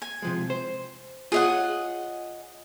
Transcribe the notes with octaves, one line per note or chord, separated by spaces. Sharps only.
G#5
C3 F3 G#3
C5
F4 G#4 C#5 D#5 F#5